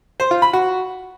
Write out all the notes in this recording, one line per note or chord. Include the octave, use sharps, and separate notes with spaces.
C5
F4
B5
F#4